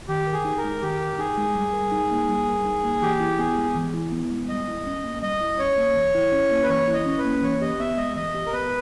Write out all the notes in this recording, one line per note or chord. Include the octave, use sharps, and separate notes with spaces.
D#3 G4
A#4
G#4
D#4
A#4
G#3
D#3 G4
A#4
D#4 G#4
G#3
G3
A#4
D#4
A#3
G3
A#4
D#4
A#3
E3 G4
E4
B3 G#4
G#3
E3
E4
B3
G#3
G3 D#5
E4
C#4
A#3
G3 D#5
E4
C#4 C#5
A#3
E3
E4
C#4
A#3
B4
E3 C#5
E4
D#5
C#4
B4
A#3
E3 C#5
G4 D#5
B3 E5
G#3 D#5
E3 D#5
G4
A#4
B3 B4